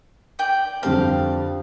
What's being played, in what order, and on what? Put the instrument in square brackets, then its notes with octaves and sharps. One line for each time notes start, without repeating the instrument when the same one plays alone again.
[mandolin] D5 G5
[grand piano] F2 D3 G3 C4 A4 [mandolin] F5 A5